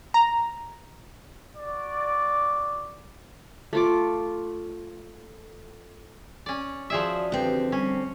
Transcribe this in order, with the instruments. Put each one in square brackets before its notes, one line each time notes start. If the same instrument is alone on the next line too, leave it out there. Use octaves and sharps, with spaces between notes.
[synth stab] A#5
[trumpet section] F#4 D5
[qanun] A3 F4 D6
[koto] C#4 D5
[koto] F3 G#4 E5 [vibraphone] F#4 D5
[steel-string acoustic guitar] D3 C4 [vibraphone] F#4 G4 B4
[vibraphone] G3 [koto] C#4